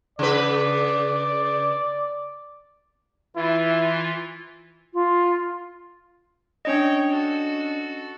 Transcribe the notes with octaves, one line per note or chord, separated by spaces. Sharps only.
C#3 B4 D5
E3 E4 F4
F4
C#4 D4 C#5 D#5 G5
F#4 A4